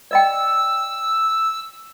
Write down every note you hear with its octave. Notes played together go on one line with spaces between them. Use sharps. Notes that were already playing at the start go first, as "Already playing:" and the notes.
D5 D#5 G5 E6